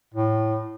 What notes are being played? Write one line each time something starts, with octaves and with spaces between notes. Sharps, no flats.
A2